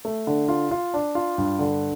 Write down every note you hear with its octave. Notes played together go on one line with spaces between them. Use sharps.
A3
D3
F4
F4
D4
F4
G2
D3